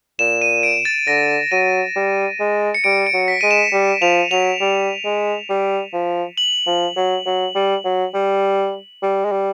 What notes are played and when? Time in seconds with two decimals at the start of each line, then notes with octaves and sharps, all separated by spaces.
0.19 A#2 E7
0.42 D#7
0.63 D7
0.85 A6
1.07 D3 A#6
1.51 F#3 D#7
1.96 G3
2.40 G#3
2.74 C#7
2.84 G3 D7
3.07 D7
3.14 F#3
3.28 B6
3.41 G#3 D#7
3.51 E7
3.73 G3
4.02 F3 F7
4.31 F#3 F7
4.61 G3
5.05 G#3
5.49 G3
5.93 F3
6.38 F#7
6.67 F3
6.96 F#3
7.26 F#3
7.55 G3
7.85 F#3
8.14 G3
9.02 G3
9.25 G#3
9.32 G3